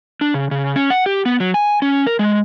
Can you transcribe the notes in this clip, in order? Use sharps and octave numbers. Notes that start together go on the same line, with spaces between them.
D4
C#3
C#3
C#4
F#5
G4
B3
F#3
G#5
C#4
A#4
G#3